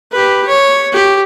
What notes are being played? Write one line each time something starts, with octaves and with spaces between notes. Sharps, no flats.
G4 B4
C#5
G4